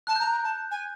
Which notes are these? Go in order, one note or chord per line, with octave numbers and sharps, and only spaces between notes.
A5 F#6
G6
A#5
F#6
A#5
A5
G#5